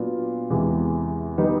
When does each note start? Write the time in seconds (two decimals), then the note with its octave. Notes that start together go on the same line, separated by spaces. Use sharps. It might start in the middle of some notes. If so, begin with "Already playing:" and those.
Already playing: A#2 F#3 B3 D4 F4
0.50 E2 C3 E3 G#3
1.38 D#3 G3 B3 D#4